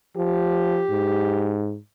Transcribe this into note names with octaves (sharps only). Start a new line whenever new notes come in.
F3 G4
G#2